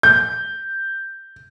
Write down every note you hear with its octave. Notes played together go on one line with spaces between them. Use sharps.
G6